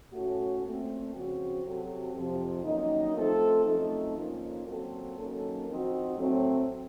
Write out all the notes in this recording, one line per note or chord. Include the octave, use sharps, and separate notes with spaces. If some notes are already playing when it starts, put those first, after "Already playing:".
A2 A3 C#4 F#4
A#2 A3 C4
C#3 F3 C4 F#4
C3 F#3 C4 F#4 A4
F2 C3 F3
F#2 D#3 A#3 D#4
F3 A3 C4 F4 A4
F#2 F3 A3 C4 D#4
F2 D#3 A#3 C#4 F4
A#2 F#3 C4 F#4 A4
D#3 F#3 A#3 C#4 A4
F3 C4 D#4 F#4
A2 F#3 A3 C4